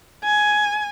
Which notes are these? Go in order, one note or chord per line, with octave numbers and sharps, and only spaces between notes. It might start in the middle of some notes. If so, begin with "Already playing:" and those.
G#5